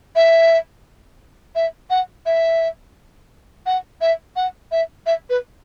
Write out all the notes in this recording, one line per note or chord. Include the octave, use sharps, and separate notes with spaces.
E5
E5
F#5
E5
F#5
E5
F#5
E5
E5
B4